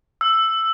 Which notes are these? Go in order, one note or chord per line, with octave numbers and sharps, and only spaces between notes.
E6